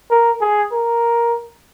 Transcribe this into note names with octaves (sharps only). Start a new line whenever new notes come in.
A#4
G#4
A#4